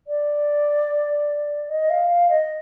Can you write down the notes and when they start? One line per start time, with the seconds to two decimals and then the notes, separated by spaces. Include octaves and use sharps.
0.07 D5
1.68 D#5
1.89 F5
2.09 F5
2.29 D#5